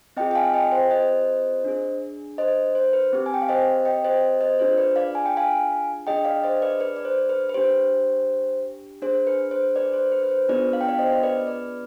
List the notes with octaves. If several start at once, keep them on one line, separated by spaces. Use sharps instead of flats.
C4 F4 G#4 D#5 G5
G5
F5 G#5
D#5 G5
C5
C5 D#5
D4 G#4
C5 D#5
C5
B4
C4 G4
G#5
G5
F5
C5 D#5
D#5 G5
C5 D#5
C5 D#5
D4 F4 G#4 C5
B4 D5
D5 F5
G#5
G5
F5 G#5
D4 G#4 D#5 G5
D5 F5
C5 D#5
B4 D5
B4 D5
D5
C5
B4
B4
D4 G4 C5
D4 G#4 C5
B4
C5
B4 D5
C5
B4
B4
C5
B3 D4 F4 G#4 B4 D5
F5
G5
D5 F5
C5 D#5
D#5
B4 D5
B4 D5